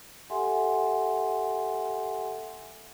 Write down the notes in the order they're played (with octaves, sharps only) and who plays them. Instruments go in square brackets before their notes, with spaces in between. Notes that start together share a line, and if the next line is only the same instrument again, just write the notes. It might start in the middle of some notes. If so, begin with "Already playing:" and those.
[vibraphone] G4 A4 E5 F#5 G#5 C6